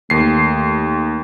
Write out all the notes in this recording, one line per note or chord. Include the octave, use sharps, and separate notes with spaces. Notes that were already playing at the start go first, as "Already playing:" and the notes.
D#2 A3 C7